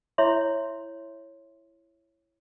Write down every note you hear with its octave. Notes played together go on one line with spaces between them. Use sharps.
E4 C#5 E5 C6